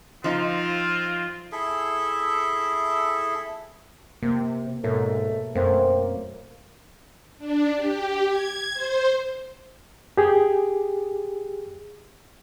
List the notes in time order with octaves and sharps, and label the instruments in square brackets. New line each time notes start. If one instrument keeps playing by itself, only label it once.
[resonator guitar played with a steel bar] F3 D#4 [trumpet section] C4 F4
[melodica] E4 G#4 A4 E5
[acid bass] C3 [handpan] A#3
[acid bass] G#2 [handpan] B2 A#4 C#5 [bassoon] A3
[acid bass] F#2 [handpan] A3 [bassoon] A#3 [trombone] C4
[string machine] D4
G4
G#6
C5
[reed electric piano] G4 G#4